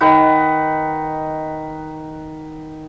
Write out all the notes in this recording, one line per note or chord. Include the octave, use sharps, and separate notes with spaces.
D#3 D#4 B4 F#5